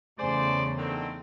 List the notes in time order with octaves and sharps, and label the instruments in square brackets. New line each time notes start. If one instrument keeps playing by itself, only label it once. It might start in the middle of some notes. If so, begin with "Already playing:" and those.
[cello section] E2 C#3 A3 [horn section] G#4 C5 D5
[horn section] D3 D#3 C4